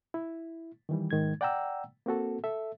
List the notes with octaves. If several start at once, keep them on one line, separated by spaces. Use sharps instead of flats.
E4
D#3 E3 G3
G#2 D#3 G#3 G#6
D5 F#5 G5 A#5 E6
A#3 C4 F#4 A4
A4 E5